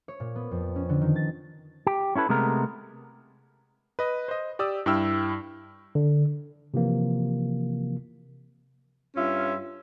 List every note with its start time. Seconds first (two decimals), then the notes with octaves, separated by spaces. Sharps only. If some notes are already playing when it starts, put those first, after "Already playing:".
0.08 C#5
0.20 A#2
0.35 B3
0.51 F2
0.76 C#4
0.89 D3
1.01 D#3
1.16 A6
1.87 G4
2.16 C#4 E4 A4 B4
2.29 C3 G#3 A3 B3 A#4
3.99 B4 D#5
4.28 C5 D#5
4.59 G4 D5 D#6 E6
4.86 G2 E4 G5 E6 F6
5.95 D3
6.74 C3 E3 F3 A#3
9.16 G2 C#4 F4 E5